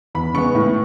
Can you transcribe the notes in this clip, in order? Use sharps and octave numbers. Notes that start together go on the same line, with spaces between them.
E2 B5
C#3 G#3 B3 C#6
A2